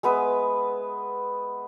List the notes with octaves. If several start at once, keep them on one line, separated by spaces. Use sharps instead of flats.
G#3 B3 B4 E5